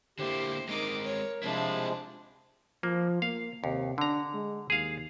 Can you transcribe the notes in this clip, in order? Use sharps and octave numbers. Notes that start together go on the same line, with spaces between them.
D3 A#3 E4 G4 C5
G#3 C4 D#4 A#4 D6
C#5
C3 F3 G#3 C4 D4 E4
F3 A#3
A#3 F5
D#2 C3
D3 D4 A#5
G#3
D#2 G#4 F5